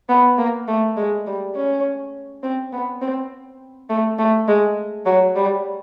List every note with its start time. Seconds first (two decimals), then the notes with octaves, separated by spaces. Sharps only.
0.09 B3
0.38 A#3
0.68 A3
0.97 G#3
1.27 G3
1.56 C#4
2.43 C4
2.73 B3
3.02 C4
3.90 A3
4.19 A3
4.48 G#3
5.06 F#3
5.36 G3